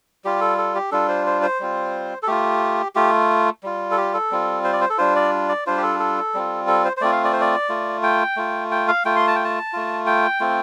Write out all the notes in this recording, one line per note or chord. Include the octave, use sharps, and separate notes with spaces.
G3 F4 G4
A4
A4
G4
G3 D4 F4 A4
C5
C5
C5
G3 C4 F4
A4
A3 F4 G4
A3 F4 G4
G3 F4
A4
G4
A4
G3 C4 F4
C5
D5
C5
A4
G3 D4 F4 C5
D5
D5
G3 D4 F4 C5
G4
A4
A4
G3 C4 F4
A4
C5
C5
A3 C4 F4 D5
F5
D5
C5
D5
A3 F4
G5
A3 F4
G5
F5
A3 F4 G5
C6
A5
G5
A5
A3 F4
G5
A3 C4 F4